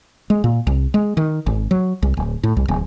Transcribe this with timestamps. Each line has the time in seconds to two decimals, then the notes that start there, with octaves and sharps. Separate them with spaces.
0.30 G#3
0.44 A#2
0.67 C2
0.94 G#3
1.17 D#3
1.46 G#1
1.71 F#3
2.03 C2
2.17 D1
2.43 A2
2.57 C2
2.68 D1